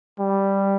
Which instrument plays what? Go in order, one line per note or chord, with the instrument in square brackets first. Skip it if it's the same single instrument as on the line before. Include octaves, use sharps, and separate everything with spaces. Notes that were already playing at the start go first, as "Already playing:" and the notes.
[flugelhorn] G3